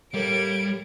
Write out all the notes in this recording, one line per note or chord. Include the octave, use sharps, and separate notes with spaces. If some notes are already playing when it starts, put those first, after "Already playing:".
D#2 A2 G3 A#3 G#6 D7